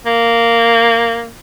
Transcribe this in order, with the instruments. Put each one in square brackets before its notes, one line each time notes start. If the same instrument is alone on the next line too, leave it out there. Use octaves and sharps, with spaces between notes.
[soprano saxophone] A#3